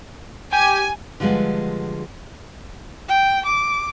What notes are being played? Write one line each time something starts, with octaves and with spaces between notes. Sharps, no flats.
G4 G#5
D3 F3 G3 G#3 B3
G5
D6